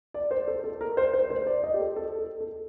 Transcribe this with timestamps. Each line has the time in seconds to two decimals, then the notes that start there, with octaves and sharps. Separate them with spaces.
0.14 D5
0.31 C5
0.48 A4
0.64 A4
0.81 A#4
0.97 C5
1.14 C5
1.30 C5
1.47 D5
1.64 D#5
1.74 G4
1.80 A4
1.96 A4
2.18 A4
2.41 A4